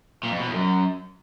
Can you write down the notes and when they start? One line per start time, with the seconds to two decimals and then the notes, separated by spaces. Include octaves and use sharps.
0.23 A#2
0.31 F2
0.39 B2
0.47 E2
0.54 F#2